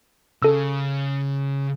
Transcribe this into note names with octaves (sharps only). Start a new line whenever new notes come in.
C#3 A4 E6